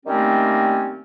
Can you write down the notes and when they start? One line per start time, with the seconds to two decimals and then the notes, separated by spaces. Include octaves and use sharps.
0.06 D#3 G3 A3 A#3 C4 C#4